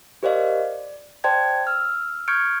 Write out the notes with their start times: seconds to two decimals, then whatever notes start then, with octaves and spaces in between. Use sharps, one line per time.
0.23 G4 A#4 C5 D5 D#5 F5
0.42 D5
1.24 C5 D5 G5 A5 C6 G#6
1.67 E6 F6
2.28 C#6 F6 G6 G#6 C#7 D7